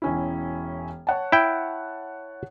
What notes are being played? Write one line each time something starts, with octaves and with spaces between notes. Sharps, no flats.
E1 C#4 E4
C#5 F#5 A5
E4 G5